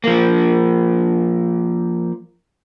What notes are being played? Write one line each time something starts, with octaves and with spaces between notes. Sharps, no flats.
F3 A#3